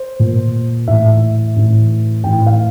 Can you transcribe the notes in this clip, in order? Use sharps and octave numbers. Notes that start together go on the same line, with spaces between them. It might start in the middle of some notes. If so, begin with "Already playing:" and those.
Already playing: C5
A#2
A2 E3 E5
A2 E3
A2 E3 G5
F5